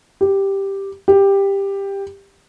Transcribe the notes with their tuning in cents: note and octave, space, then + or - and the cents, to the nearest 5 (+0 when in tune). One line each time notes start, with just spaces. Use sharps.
G4 +0
G4 +10